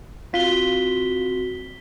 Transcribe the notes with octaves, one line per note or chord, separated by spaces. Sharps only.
C4 F4 F#4 B6 G7